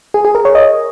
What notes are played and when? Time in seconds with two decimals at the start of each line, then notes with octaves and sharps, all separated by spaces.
0.14 G#4
0.25 G#4
0.35 A#4
0.45 C#5
0.55 D#5